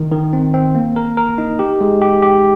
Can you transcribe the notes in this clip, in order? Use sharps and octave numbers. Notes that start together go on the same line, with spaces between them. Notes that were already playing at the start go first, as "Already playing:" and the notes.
Already playing: D#3
D#3
C4
C4
A#3
A#4
A#4
D#4
G4
G#3
G4
G4